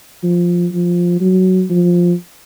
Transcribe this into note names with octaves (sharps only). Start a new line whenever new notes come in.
F3
F3
F#3
F3